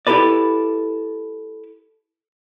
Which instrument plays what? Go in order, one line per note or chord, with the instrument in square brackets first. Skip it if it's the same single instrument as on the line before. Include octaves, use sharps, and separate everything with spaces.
[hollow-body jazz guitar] E4 G4 A4 B4 D5